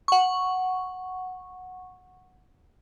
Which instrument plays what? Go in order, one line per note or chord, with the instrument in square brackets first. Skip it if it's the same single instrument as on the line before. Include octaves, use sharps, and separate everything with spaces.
[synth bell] F#5 C#6